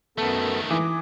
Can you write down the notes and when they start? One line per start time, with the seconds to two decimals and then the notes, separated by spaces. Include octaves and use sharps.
0.18 F#2 D#3 A3 B3 A4
0.70 E3 D6 D#6